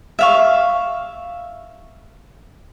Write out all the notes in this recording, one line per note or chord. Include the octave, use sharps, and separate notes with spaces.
E5 F5 C#6